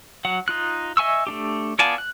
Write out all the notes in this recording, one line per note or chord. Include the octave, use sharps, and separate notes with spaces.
F#3 F#5
D#4 F4 F#6
D#5 E5 G#5 C#6 E6
A3 D4 G4
B3 F4 D5 G#5 A5
F#6